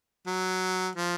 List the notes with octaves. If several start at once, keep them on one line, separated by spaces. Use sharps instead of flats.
F#3
F3